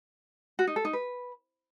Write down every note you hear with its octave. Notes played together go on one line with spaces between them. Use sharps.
F#4
D#4
A4
D#4
B4